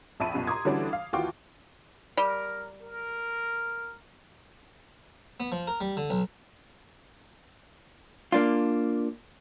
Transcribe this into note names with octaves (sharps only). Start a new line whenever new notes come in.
A#1 F2 E5 A5 B5 D#7
C2 F#2 B2
A#5 C6 D6 D#6 G#6
D3 E3 G3 C#4 D4 F#4
F5
D#2 E3 F4 F#4 G5 D6
G3 A#4
A#4
B3
F3
A#4
G3
D3
B1
A#3 D4 F4